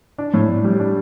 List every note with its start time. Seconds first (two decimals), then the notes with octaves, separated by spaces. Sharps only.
0.18 D4
0.34 A2
0.49 A2
0.64 G3
0.80 D4